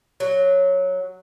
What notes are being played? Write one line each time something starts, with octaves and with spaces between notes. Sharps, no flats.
F#3